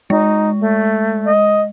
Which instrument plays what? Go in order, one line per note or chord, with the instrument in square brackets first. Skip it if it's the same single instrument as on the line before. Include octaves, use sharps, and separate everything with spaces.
[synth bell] G#3 [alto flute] D#4
[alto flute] A3
[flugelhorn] D#5